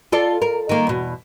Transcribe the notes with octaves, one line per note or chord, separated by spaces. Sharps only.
F4 A4 D5
A#4
D#3 A#3
E2 B2